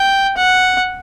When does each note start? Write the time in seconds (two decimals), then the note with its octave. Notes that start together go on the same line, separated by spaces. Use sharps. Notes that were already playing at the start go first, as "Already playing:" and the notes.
Already playing: G5
0.37 F#5